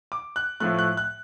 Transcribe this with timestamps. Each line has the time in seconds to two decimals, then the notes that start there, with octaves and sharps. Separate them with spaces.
0.12 D6
0.36 F#6
0.60 A2 F3 A3 F#6
0.79 F#6
0.97 F#6